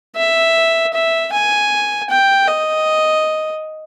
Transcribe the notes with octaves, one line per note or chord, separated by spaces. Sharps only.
E5
E5
G#5
G5
D#5